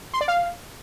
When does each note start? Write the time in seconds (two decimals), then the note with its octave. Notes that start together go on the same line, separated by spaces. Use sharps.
0.14 C6
0.21 D5
0.28 F5